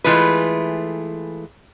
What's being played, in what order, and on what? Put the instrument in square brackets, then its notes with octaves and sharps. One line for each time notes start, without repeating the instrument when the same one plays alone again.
[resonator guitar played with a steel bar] E3 G#3 A3 F4 B4